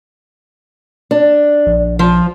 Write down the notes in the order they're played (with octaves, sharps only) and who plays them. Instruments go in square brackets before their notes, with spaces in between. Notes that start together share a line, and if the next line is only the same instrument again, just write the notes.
[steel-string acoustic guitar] D4
[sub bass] A#1
[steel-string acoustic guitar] F3